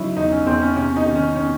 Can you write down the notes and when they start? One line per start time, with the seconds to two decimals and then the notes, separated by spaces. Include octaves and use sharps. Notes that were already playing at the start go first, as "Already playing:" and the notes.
Already playing: C#3 F#3 D#4 E4
0.17 E2 D#4
0.32 C#4
0.46 E2 C4
0.62 C#4
0.76 C3 C#4
0.96 D#4
1.06 D#3
1.16 C#4
1.36 C#4